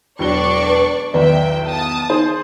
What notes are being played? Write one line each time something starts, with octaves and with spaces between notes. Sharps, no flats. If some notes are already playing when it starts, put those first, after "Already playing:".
E1 F#3 D4 D5 C#6 G7
B4
B1 E2 D#3 B4 D5 E5 G5
A5 D#6
D#4 G#4 C5